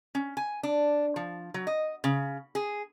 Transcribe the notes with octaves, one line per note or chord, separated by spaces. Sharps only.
C#4
G#5
D4
F3
F#3
D#5
C#3
G#4